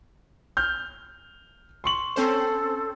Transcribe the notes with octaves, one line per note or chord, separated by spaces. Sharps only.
F6 G6
C6 C#6 F#7
C4 C#4 A4 C5